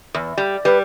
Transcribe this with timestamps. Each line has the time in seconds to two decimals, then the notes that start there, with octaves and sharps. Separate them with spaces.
0.15 E2
0.38 G3
0.65 G3 B4